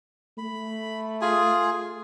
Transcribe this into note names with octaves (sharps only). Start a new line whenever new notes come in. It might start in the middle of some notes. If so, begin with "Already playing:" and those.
A3 B5
F4 G#4 G#5